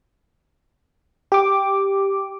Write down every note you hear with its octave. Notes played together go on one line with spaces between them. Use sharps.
G4 D6